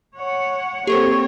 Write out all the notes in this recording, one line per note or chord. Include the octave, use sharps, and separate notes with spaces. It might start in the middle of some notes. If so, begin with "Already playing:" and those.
C#5 F#5
A#3 C4 G4 A4 C5 C#5